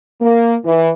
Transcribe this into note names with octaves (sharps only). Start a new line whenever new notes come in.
A#3
E3